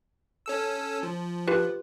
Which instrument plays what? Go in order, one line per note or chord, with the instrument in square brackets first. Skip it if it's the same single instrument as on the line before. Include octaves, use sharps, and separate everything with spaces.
[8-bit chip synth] C#4 A4 E6
F3
[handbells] F4 G4 B4